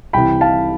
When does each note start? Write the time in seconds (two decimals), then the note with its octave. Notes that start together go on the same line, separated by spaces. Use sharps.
0.13 C2 C3 E3 G5 B5
0.41 F5 A5